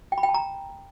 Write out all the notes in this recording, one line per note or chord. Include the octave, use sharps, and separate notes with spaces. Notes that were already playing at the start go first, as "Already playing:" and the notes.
G5
B5
G5
A5
A#5